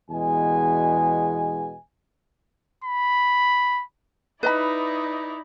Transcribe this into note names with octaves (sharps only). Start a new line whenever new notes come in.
E2 B2 G#3 G#5
B5
D#4 E4 B4 D5 D#5 B5